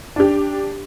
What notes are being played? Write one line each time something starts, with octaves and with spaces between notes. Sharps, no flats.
D4 G4